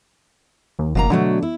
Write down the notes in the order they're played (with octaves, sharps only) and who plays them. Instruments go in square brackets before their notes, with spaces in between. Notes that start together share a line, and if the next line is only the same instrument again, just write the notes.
[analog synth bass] D#2
[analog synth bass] F#1 [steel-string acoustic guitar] B2 A#3 A#5
[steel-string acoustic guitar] B2 F#3 A3 [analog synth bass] D3
[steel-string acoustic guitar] E4